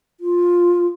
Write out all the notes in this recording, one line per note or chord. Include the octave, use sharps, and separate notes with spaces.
F4